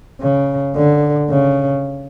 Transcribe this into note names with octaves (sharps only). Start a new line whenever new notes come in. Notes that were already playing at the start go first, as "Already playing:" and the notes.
C#3
D3
C#3